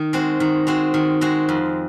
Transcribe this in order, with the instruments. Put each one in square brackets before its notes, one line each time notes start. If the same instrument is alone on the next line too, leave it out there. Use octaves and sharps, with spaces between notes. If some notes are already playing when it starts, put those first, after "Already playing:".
Already playing: [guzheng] D#3
G#3 C4 F#4
D#3
G#3 C4 F#4
D#3
G#3 C4 F#4
F2